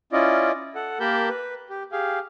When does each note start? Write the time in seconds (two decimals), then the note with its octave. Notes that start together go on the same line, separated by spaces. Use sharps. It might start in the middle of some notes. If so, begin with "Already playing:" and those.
0.13 C#4 E4 F4 D5 D#5
0.75 A4 F#5
1.00 A#3 G4 A#4 A5 B5 G6
1.29 B4
1.70 G4
1.92 G4 G#4 F5